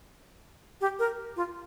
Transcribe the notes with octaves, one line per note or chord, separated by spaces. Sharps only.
G4
A#4
F4